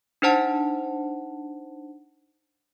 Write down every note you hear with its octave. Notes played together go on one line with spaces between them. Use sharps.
D4 D#4 C5 F#5 A5